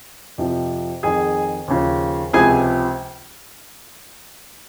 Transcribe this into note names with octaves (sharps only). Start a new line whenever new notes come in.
F2 C3 F3
F2 D#3 G#4 G#5
D#2 C#3 F3
C#2 C3 F3 G#4 G#5